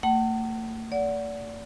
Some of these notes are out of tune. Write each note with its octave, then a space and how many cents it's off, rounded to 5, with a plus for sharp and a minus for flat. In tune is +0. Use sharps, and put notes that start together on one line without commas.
A3 +40 F#5 +40
D5 -30 F#5 +0